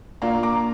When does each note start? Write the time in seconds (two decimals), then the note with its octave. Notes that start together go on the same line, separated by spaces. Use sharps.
0.22 A#2 A#3 D4 F4 F5 A#5
0.43 A#5 D6